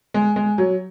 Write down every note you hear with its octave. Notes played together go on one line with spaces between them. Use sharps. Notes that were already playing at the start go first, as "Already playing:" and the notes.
G#3
G#3
F#3